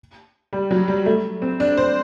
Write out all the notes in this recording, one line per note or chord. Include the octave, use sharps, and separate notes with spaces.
G3
F#3
G3
A3
C4
D4
C5